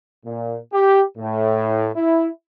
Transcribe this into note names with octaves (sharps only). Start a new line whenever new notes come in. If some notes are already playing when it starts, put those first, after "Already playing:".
A#2
G4
A2
E4